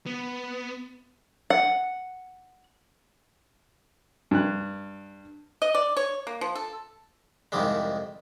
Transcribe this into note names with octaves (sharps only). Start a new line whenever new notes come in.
B3
F#5
G2 F#6
D#5
D5
C#5
A#3
F3
A4
C2 F2 G#2 D#3 G3 G#3